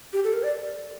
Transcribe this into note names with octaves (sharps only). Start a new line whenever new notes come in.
G4
A4
A#4
D5